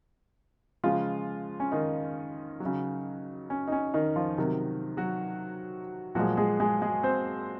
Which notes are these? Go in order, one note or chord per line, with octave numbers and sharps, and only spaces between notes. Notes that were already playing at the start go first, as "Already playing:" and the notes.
C#3 F3 G#3 F4
C#4
D#3 D#4
F#3
C#3
C#4
D#4
C#4
D#3 D#4
F3 F4
C3 D#3 F#3
F#3 F#4
A#2 F3 F#3 G#3 F#4
G#3 G#4
G#3 G#4
G#3 G#4
C4 C5